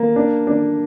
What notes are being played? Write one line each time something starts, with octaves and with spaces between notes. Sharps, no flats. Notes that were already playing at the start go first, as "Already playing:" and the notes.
Already playing: A#3
D4
D4